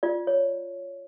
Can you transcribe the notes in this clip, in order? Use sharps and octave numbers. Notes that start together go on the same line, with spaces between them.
F4 D5
C#5